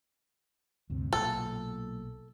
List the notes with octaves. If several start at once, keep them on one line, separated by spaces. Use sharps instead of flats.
D2 G2 C3
B1 A#2 A4